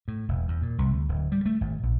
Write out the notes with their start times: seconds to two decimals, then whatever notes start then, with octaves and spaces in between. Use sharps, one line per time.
0.08 A2
0.28 E1
0.48 E2
0.62 A#2
0.78 C2
0.91 D2
1.09 D1
1.32 G3
1.46 A3
1.61 G#1
1.83 A#1